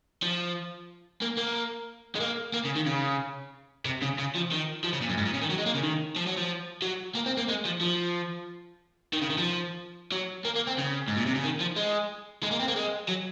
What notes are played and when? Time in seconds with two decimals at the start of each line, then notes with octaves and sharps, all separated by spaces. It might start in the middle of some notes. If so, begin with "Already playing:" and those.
0.23 F3
1.22 A#3
1.38 A#3
2.15 G#3
2.20 A#3
2.54 A#3
2.65 C#3
2.76 D#3
2.86 C#3
3.85 C3
4.02 C#3
4.18 C#3
4.35 F3
4.51 D#3
4.84 F3
4.93 C#3
5.01 A#2
5.09 F#2
5.18 G#2
5.26 A#2
5.34 C#3
5.42 D#3
5.50 F#3
5.59 G#3
5.67 A#3
5.75 C#3
5.83 D#3
6.17 F3
6.27 F#3
6.37 F3
6.82 F#3
7.15 A#3
7.26 C4
7.37 A#3
7.48 G#3
7.65 F3
7.81 F3
9.13 D#3
9.21 C#3
9.29 D#3
9.38 F3
10.12 F#3
10.45 A#3
10.56 A#3
10.67 C4
10.78 C#3
11.08 G#2
11.17 A#2
11.26 C3
11.35 C#3
11.44 D#3
11.61 F3
11.77 G#3
12.43 G#3
12.51 A#3
12.60 C4
12.68 A#3
12.76 G#3
13.09 F#3